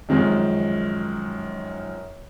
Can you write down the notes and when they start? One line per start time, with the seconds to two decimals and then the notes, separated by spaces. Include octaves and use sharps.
0.09 F#2 D#3 F3 G#3